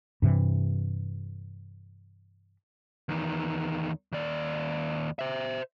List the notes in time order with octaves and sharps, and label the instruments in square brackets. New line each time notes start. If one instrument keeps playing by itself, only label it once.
[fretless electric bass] G2 C3 E3
[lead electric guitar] E2 D#3
D#2 D5
C5 E5